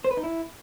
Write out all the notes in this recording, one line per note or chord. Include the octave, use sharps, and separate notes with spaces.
C5
B4
D#4
E4